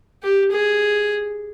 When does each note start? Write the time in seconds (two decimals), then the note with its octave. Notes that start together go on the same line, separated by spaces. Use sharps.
0.23 G4
0.51 G#4